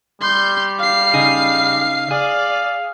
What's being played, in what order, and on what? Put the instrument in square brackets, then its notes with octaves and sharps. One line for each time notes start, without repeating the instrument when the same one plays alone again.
[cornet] G3 [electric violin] C6 G6
[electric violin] F5 C7
[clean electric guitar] C#3 D#4 G#4
[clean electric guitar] G#4 [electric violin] D5 [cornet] F5